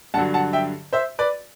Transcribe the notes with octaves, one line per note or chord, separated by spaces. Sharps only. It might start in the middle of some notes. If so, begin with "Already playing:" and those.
G2 D3 F#3 F#5 A5
F#5 A5
E5 G5
C5 E5
B4 D5